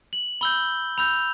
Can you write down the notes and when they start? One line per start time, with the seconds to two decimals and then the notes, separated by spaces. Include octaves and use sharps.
0.13 F#7
0.41 B5 E6 G6 G7
0.98 B5 E6 G6 F7